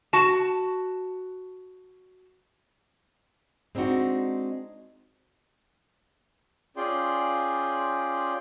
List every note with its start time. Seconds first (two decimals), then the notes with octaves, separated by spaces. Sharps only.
0.13 F#4 A5
3.75 G#3 C4 D4 D#4 F#4
6.77 C#4 F4 G#4 D5 G5 C6